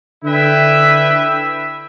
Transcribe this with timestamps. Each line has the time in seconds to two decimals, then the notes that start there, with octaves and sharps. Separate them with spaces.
0.24 D3 E4 B4 E5 G5